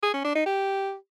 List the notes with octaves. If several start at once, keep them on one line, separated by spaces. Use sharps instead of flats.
G#4
C#4
D4
D#4
G4